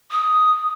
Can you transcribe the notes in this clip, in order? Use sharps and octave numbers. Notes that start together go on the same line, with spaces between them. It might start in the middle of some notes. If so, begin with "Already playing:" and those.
D#6